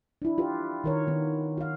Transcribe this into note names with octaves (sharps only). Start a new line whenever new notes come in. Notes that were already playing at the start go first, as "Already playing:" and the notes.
D4 E4
F4 G4 B4
D#3 A#4 C#5
D#3 B3
F#4 F5